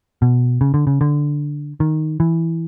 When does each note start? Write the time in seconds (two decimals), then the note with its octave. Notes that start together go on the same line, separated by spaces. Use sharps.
0.22 B2
0.61 C#3
0.74 D3
0.87 C#3
1.01 D3
1.80 D#3
2.20 E3